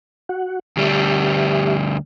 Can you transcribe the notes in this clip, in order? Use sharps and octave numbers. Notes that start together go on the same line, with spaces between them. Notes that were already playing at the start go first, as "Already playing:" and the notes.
F#4 F#5
D2 G3 G4 E5